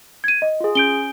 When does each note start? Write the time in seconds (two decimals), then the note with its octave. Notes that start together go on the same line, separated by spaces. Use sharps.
0.24 G#6 D#7
0.42 D#5
0.60 F4 G#4
0.75 C#4 G6 D7 G7